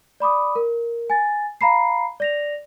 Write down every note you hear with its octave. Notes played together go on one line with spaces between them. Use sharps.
D5 B5 D6 D#6
A#4
G#5 A6
F5 A#5 B5 C7
D5 A#6 F7